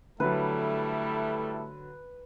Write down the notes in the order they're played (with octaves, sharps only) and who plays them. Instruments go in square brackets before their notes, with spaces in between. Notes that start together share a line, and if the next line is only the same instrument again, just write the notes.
[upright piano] D3 F#3 [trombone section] G3 E4 A4 [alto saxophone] A3 [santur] B4